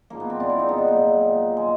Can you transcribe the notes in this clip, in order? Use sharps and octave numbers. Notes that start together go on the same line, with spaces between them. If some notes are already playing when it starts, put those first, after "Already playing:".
G#2 F3 A#3
B3
C4
D4
E4
D#4
B3
A#3
A#2 F#3
G#3